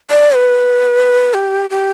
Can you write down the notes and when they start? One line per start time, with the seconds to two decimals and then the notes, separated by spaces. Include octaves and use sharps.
0.10 D5
0.35 B4
1.34 G4
1.70 G4